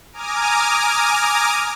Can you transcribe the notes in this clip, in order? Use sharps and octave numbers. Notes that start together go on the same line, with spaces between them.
G#5 A#5 D6 D#6 F6